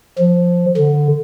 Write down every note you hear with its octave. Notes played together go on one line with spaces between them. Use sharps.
F3
D3